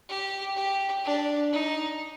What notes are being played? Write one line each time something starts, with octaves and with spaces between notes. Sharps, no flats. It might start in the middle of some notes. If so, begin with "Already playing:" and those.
G4
G4
D4
D#4